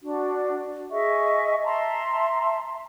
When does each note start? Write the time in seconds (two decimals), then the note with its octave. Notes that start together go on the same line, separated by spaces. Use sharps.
0.02 D4 F#4
0.91 G#4 D#5 E5 C#6
1.64 E5 A5 A#5 C6